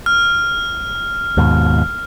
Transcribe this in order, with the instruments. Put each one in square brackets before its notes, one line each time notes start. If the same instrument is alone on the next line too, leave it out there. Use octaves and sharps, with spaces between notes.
[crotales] F6
[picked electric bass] D#2 G#2 B2